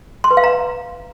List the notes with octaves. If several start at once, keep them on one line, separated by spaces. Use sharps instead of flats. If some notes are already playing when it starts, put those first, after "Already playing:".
C6
B4
F5
A#5